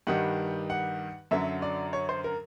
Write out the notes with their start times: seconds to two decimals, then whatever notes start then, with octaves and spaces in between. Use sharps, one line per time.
0.07 G2 D#3 G3 F#5
0.70 F#5
1.31 F#2 D3 F#3 E5
1.62 D5
1.93 C#5
2.09 C5
2.24 A#4